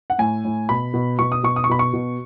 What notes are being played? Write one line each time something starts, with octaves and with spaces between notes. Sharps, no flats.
F#5
A2 G#5
A2
B2 B5
B2
B2 C#6
D#6
B2 C#6
D#6
C#6
B2 B5
C#6
B2